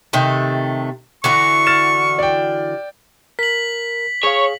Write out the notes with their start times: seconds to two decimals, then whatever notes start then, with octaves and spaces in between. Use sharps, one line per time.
0.13 C3 D#3 A3
1.24 D3 E3 F#4 C#6
1.67 F6 A6 E7
2.19 D5 G5
3.39 A#4 B6 F#7
4.23 G#4 C#5 F5